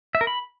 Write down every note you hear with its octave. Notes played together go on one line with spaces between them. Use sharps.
E5
A#4
B5